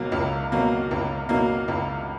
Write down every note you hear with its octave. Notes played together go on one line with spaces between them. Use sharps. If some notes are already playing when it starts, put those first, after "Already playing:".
Already playing: C#2 B2 F#3 A#3
C#2
B2 F#3 A#3
C#2
B2 F#3 A#3
C#2